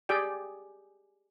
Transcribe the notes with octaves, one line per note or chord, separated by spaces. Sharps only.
G4 G#4 D5 G5